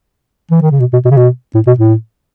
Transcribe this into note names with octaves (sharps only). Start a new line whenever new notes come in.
E3
D#3
C#3
B2
B2
B2
C#3
B2
A2
B2
A2